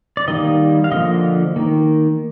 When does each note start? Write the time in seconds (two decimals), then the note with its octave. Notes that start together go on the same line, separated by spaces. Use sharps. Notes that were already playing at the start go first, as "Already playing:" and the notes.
0.17 D5
0.28 D#3 G3 A#3 D#5
0.84 F5
0.92 D3 F3 A#3 D#5
1.56 D#3 A#3